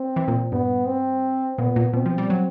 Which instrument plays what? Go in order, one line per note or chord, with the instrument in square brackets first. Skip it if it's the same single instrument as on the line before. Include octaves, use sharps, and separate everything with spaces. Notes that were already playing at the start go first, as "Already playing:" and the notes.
Already playing: [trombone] C4
[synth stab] E3
A#2
[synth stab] G2 [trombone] B3
[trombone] C4
[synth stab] A#2 [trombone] B3
[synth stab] A#2
[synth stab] B2 [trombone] C4
[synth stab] F3
G3
F#3